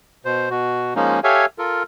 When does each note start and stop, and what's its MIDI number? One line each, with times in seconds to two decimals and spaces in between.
0.25 0.49 47
0.25 0.49 72
0.50 0.94 47
0.50 0.94 66
0.96 1.20 53
0.96 1.20 56
0.96 1.20 58
0.96 1.20 61
0.96 1.20 63
1.24 1.46 67
1.24 1.46 69
1.24 1.46 73
1.24 1.46 76
1.24 1.46 77
1.24 1.46 80
1.58 1.83 65
1.58 1.83 69
1.58 1.83 70